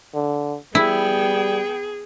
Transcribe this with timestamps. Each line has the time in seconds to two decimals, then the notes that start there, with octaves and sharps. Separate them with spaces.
0.14 D3
0.75 G3 B3 E4 G#4 G5